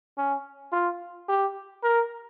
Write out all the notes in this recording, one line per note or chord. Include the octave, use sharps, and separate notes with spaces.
C#4
F4
G4
A#4